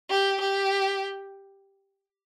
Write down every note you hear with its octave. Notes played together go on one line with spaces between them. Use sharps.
G4
G4